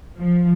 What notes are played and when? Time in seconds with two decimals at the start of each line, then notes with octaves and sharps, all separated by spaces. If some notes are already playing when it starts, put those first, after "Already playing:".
0.18 F3